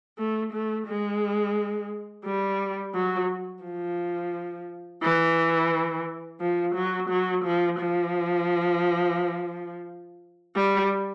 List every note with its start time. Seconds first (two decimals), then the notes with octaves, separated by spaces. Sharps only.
0.18 A3
0.52 A3
0.87 G#3
2.25 G3
2.95 F#3
3.64 F3
5.02 E3
6.40 F3
6.75 F#3
7.09 F#3
7.45 F3
7.79 F3
10.55 G3